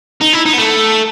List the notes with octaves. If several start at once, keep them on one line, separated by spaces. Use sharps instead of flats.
D#4
E4
D#4
B3
A3